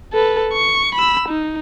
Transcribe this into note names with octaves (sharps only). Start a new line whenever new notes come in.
A4 B4
C#6
B5 E6
D#4